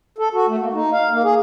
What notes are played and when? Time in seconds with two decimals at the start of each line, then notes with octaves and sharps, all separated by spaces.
0.18 A4
0.34 F#4
0.48 A3
0.61 A#3
0.73 D#4
0.92 F5
1.11 A#3
1.24 G#4